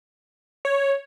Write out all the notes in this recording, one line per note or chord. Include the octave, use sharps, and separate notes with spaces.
C#5